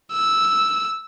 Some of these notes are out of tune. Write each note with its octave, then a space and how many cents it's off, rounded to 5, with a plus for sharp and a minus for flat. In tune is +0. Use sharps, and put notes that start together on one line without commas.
E6 -5